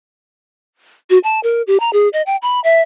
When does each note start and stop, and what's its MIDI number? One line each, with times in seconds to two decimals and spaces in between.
1.10 1.18 66
1.24 1.40 81
1.43 1.62 70
1.67 1.80 67
1.80 1.90 82
1.93 2.09 68
2.13 2.22 75
2.26 2.36 79
2.42 2.60 83
2.64 2.82 76